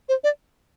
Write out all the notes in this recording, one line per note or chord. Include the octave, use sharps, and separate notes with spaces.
C5
D5